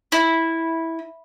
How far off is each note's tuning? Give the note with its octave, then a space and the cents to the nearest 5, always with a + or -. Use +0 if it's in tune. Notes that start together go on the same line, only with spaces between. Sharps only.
E4 -10